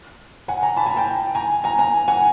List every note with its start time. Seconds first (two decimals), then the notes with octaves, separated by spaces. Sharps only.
0.48 F#5 G#5
0.63 G#5 A#5
0.77 A5 B5
0.86 G#5 A#5
0.96 G5 A5
1.35 G#5 A#5
1.64 G#5 A#5
1.79 G#5 A#5
2.08 F#5 G#5